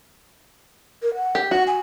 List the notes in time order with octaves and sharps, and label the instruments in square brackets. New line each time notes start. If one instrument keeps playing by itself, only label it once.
[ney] A#4
F#5
[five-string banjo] G4
[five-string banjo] F#4 [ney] F#5
[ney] G#5